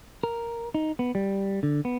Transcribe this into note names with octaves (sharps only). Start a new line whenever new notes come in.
A#4
D#4
B3
G3
D3
B3